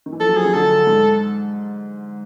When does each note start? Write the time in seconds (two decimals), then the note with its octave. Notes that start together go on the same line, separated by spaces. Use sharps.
0.06 D#3
0.13 E3
0.20 F3 A4
0.29 F#3
0.37 F3 G#4
0.45 D#3
0.54 D3 A4
0.87 G#2